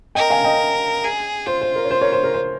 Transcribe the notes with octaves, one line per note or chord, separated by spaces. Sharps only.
A#4 D#5 G5
F5 G#5
D#5 G5
G#4
F4 C5
C5
A#4
C#5
C5
A#4 C#5
C5
A#4
C5